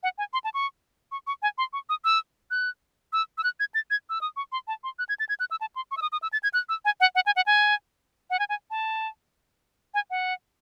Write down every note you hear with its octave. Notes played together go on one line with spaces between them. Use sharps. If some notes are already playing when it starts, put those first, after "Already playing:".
F#5
G#5
C6
A5
C#6
C#6
C#6
G#5
C6
C#6
D#6
E6
F#6
E6
E6
F#6
G#6
A6
G#6
E6
D#6
C#6
C6
A5
C6
F#6
G#6
A6
G#6
F#6
E6
A5
C6
C#6
E6
D#6
D#6
E6
A6
G#6
F#6
E6
G#5
F#5
F#5
G#5
F#5
G#5
F#5
G#5
G#5
A5
G#5
F#5